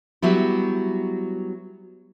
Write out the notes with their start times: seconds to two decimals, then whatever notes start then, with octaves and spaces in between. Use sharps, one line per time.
0.22 F#3 G3 B3 E4